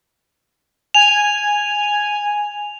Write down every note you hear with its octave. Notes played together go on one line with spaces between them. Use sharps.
G#5 F7